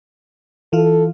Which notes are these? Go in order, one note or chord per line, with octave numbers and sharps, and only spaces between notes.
E3 F4 A4